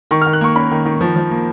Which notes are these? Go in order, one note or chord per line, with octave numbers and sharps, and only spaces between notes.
D#3 C#6
F6
D#3
F#6
A#3 C#6
C#4 B5
D#3
D#3
F3
F3
A#3